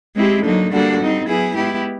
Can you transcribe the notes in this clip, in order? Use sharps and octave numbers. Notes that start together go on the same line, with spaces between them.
G#3 C4 E4 G4
D3 F#3 A#3 D#4
D3 G3 A#3 D4 F#4
G3 C4 D#4
F#3 B3 E4 G#4
G#3 B3 E4 G4